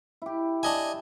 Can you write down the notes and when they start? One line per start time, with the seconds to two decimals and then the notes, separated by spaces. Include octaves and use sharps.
0.22 E4 G4
0.63 D4 D#5 G#5